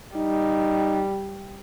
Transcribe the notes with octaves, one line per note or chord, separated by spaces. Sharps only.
G3 D#4